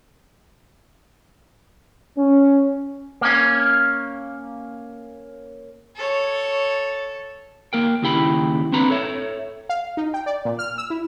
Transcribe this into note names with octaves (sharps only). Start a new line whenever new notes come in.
C#4
A#3 C#4
A4 C#5
A#3 A#4 G5
D#2 C#3 E4 G4 G5 B5
C4 D4 B4 A#5 B5
A4 C#5 E5
F5
D#4
G5
D5
A#2
F6
E6
E4